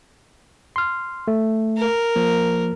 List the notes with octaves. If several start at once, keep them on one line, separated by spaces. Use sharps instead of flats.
C6 F6
A3
A#4
F3 A#3